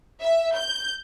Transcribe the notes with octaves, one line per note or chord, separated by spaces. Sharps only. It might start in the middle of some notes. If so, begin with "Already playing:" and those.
E5
G6